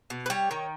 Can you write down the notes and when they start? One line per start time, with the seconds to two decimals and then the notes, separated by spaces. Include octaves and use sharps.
0.10 B2
0.26 B4
0.30 G3 C#5
0.51 D#3